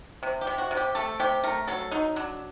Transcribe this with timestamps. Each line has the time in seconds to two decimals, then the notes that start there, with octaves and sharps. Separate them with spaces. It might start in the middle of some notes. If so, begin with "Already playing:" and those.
0.23 C3
0.41 G4
0.47 C3
0.58 F#4
0.71 C3
0.77 G4
0.95 A3 A4
1.20 C3 G4
1.44 A3 A#4
1.67 F#3 A4
1.91 F#3 D#4
2.16 F#3 D4